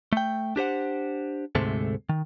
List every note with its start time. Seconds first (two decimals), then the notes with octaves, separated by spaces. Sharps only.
0.13 A3 G5
0.56 D4 G4 C5 F#5
1.55 D2 G#2 C3 G#3 A3 A4
2.09 D#3